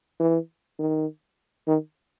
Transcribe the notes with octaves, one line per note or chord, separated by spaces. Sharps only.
E3
D#3
D#3